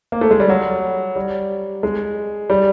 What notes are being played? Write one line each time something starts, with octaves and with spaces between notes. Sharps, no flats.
A#3
A3
G#3
G3
F#3
G3
G#3
G3